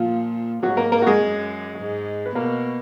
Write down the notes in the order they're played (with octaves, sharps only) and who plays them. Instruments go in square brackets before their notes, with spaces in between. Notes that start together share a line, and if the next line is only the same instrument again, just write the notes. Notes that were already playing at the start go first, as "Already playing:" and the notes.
Already playing: [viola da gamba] A#2 [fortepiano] F3 F4
[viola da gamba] G#2 [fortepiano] F#3 F#4
[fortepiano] A#3 A#4
A#3 A#4
F#4
G#3 G#4
[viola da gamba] F#2
G#2
[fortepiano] B4
[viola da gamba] B2 [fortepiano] A#3 A#4